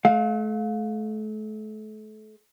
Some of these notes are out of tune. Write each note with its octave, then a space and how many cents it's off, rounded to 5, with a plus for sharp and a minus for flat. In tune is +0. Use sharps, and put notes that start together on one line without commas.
A3 -35 F5 +20